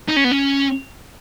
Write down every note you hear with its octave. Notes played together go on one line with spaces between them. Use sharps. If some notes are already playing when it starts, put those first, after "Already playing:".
D#4
C#4
B3
C#4